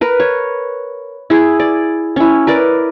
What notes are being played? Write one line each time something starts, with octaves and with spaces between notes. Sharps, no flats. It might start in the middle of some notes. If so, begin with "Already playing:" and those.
A#4 B4
C#5
E4 G#4
D5
C#4 E4
A#4 B4 D5